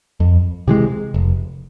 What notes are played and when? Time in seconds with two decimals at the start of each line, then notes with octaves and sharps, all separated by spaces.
0.20 F2
0.68 C3 E3 G#3
1.14 F1